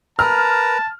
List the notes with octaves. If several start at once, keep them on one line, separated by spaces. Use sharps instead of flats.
A#4 B4 A5 A#5 F6